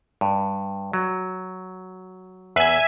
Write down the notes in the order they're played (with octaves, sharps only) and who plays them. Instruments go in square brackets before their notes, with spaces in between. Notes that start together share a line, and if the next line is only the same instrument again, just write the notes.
[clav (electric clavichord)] G2
F#3
[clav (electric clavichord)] E2 B4 [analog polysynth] E5 G#5